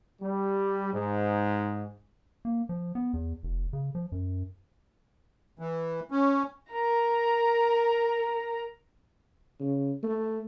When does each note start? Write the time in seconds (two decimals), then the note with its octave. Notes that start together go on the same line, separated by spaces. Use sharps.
0.20 G3
0.93 G#2
2.45 A#3
2.69 F3
2.95 B3
3.13 E2
3.43 F1
3.73 C#3
3.95 F3
4.12 F#2
5.59 E3
6.11 C#4
6.73 A#4 A#5
9.60 C#3
10.03 A3